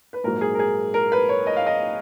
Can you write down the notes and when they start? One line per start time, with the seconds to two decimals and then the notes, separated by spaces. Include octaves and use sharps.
0.13 B4
0.23 A#1 G#2 F#3 A#4
0.41 G#4
0.55 A#4
0.59 G#4
0.94 A#4
1.12 B4
1.29 C#5
1.46 D#5
1.56 F5
1.66 D#5